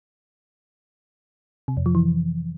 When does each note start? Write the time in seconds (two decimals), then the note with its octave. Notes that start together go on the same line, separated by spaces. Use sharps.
1.68 C3
1.77 F2
1.86 F3
1.95 E3